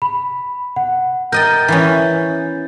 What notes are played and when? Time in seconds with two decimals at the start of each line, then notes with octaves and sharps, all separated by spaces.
0.02 B5
0.76 F#5
1.32 A#4 D#5 G5 G6 A6
1.68 E3 B3 C#4